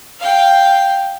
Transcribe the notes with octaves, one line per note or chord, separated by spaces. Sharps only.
F5 G5